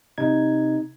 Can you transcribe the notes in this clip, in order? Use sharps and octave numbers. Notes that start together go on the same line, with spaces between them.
C3 D#4 G#6